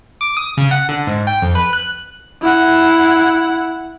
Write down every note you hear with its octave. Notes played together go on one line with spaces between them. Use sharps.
D6
D#6
C#3
F#5
D3
G#2
G5
F2
B4
F#6
E4 F#5